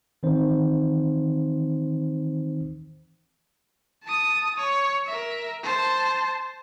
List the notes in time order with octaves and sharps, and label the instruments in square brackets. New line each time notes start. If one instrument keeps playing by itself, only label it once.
[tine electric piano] D#3 E3 C4 D#4 C5
[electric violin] A5 D#6
C#5
A#4 E5
C5 A5